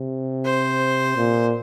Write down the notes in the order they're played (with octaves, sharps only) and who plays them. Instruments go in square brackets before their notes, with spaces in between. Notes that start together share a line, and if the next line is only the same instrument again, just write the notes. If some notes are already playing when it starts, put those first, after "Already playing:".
Already playing: [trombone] C3
[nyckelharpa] C5
[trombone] A#2